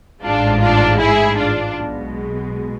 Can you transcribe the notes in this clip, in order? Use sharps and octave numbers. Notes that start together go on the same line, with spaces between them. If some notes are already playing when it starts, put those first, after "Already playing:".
A1 G#2 G#3 D4 F4
D4 F4
E4 G#4
D4 F4
B1 B2 G#3